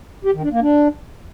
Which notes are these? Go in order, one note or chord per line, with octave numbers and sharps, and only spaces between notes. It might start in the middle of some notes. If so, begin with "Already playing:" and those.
G4
D#3
D4
A#3
D4